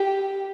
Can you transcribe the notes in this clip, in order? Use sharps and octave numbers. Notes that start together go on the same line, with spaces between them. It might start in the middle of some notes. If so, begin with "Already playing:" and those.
Already playing: G4